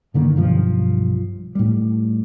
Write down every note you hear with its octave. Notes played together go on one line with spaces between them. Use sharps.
G2 D3 D#3 A#3
B1 G2 F3
A2 G3